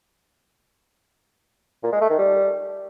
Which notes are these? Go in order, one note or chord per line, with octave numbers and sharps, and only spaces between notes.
A#2
G#3
A3
D#3
G3